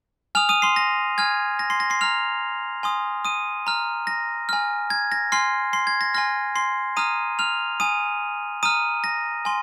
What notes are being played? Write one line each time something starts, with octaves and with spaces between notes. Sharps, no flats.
G#5 D#6 F6 F7
D#6 D#7
C6 C7
A#6
G#5 F6 G#6
A#6
C6 C7
A#6
C6 C7
A#5 F6 F7
G#5 C6 D#6
D#6 D#7
A#5 F6
A#6
G#5 F6
G#6
A#6
G#5 C6 F6 C7
C6 C7
G#6
A#6
G#5 C6 F6 A#6
C6 C7
A#5 D#6 F6 D#7
F6 F7
G#5 D#6 D#7
A#5 D#6 F6 D#7
A#6
G#5 C6